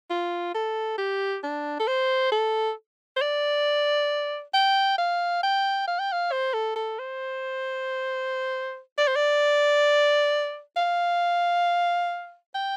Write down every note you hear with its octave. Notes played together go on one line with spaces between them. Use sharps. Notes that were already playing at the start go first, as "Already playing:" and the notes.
F4
A4
G4
D4
A4
C5
A4
C5
D5
G5
F5
G5
F5
G5
F5
C5
A4
A4
C5
D5
C5
D5
F5
G5